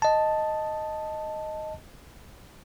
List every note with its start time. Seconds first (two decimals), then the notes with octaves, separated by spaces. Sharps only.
0.02 D#5 A5